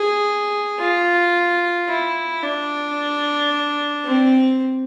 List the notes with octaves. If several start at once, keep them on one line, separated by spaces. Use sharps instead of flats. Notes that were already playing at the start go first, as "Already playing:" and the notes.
Already playing: G#4
F4
E4
D4
C4